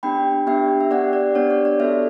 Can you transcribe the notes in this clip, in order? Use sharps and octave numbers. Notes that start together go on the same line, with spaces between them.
B3 D4 G4 G5 B5
B3 D4 G4 E5 G5
E5
B3 D4 G4 D5 F#5
D5
B3 D4 G4 C#5
D5
D5
B3 F#4 A4 C#5 E5